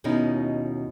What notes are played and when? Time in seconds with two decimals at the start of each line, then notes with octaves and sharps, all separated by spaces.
0.04 D#2 B2 C#4 D#4 E4